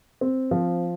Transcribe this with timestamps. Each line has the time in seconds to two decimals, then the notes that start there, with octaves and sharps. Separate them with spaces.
0.21 C4
0.51 F3